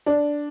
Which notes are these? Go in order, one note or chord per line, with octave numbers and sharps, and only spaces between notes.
D4